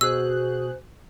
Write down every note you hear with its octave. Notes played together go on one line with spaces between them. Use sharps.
B2 F#4 G#4 C5 E6 F#6